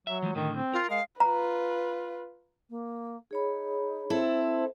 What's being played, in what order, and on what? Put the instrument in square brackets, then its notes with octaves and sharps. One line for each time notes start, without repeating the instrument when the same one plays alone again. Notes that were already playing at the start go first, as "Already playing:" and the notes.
[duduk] F#3 [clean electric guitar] E5
[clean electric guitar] E3 F3 G#3
[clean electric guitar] A2 D3 [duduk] D#3
[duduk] C4
[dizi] F4 [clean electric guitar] A#4
[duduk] G#3 [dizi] F5
[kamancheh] F4 B4 [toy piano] A#5
[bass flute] A#3
[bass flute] D#4 [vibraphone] G#4 C#5 B5
[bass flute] C4 [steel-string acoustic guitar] E4 A4
[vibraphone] C5